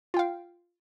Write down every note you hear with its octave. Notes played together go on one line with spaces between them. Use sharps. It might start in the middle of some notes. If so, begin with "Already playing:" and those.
F4 F5 G5